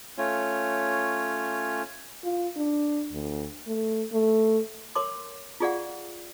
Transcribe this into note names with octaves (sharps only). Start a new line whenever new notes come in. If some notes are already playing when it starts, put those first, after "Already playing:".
A3 C#4 F4 C#5
F4
D4
D2
A3
A3
A#4 C#5 C6 D6
F4 G4 G#4 D5 F5 F#5